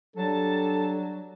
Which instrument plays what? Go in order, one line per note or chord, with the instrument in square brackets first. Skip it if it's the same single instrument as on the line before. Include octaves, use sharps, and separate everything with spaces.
[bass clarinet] F#3 [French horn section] G3 D4 [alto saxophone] A4 [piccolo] A5